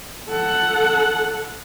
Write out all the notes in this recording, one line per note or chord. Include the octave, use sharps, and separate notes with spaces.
A4 F#5